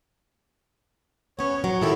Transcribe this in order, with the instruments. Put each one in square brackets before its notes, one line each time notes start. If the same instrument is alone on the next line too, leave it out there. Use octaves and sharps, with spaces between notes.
[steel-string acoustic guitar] B3 C#4 [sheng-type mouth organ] C#5
[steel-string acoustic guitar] F#3
[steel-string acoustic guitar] D#3 E4 G4 [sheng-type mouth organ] A4